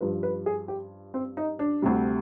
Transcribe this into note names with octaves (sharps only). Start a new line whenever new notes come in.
G2 F3 B4
B4
G#4
G4
C4
D#4
D4
D2 C3 G3